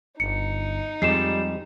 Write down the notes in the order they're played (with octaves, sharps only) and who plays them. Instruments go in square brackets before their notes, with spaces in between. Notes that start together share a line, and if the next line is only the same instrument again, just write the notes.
[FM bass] G1 [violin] D#4 [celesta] C#7
[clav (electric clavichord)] F2 G#3 [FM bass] G3 [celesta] C7 E7